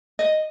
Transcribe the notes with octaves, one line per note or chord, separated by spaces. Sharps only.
D#5